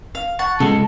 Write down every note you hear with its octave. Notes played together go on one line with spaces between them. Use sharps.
F5
F#5 A5 C#6
C#3 G#3 A4